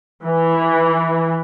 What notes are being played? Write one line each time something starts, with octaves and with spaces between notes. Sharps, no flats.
E3